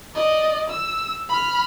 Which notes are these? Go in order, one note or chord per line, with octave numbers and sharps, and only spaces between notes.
D5 D#5
E6
B5 F6